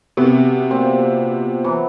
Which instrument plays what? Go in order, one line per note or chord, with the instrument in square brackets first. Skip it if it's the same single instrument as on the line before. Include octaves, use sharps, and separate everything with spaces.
[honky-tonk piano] C3 B3 [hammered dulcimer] F#4
[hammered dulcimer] A#2 C4
E3 F#3